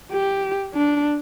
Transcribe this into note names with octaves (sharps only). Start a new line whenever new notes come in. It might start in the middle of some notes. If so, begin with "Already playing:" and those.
G4
D4